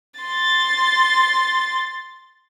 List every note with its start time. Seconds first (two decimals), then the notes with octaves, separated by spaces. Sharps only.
0.20 C6 A6